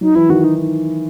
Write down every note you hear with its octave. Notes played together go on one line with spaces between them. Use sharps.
F#3 D#4
E3 E4
D#3 F#4
D#4